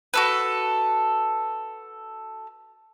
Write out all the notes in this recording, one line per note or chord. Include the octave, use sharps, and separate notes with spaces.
F#4 A4 B4